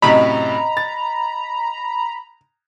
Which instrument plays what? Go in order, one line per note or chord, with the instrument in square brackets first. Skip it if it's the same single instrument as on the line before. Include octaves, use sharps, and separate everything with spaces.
[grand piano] F#2 A2 C3 [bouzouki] D#5 [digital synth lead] A#5 [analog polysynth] B5
[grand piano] A6